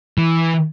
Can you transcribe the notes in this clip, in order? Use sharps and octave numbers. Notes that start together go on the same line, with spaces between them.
E3